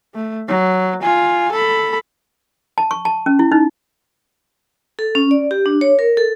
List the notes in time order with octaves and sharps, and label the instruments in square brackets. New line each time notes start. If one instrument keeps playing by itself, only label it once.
[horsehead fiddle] A3
F#3
F4 G#5
A4 B5
[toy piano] A5
C#6
A5
C#4
E4
D#4
[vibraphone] A4
C#4
D5
G4
D4
C#5
A#4
A4